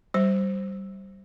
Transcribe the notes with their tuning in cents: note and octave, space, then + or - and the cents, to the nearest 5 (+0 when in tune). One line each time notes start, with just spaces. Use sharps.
G3 -20 C5 +0